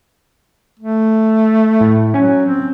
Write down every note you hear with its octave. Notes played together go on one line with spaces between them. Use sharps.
A3
A2
F#3 C#4 G#5
C4